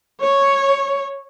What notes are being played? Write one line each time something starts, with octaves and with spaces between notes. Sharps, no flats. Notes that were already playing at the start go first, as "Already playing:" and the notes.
C#5